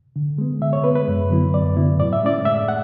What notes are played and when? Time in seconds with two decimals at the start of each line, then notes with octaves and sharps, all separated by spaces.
0.16 D3
0.38 G#3 B3
0.61 D3 E5
0.73 C#5
0.84 G#3 B3 B4
0.96 B4
1.08 F#2
1.30 D3 F#3 B3 E4
1.54 F#2 D5
1.76 D3 F#3 B3 E4
2.00 A2 D5
2.13 E5
2.23 G#3 C#4 E4 D5
2.45 A2 E5
2.68 F#5